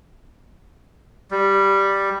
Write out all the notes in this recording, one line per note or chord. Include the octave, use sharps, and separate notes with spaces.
G3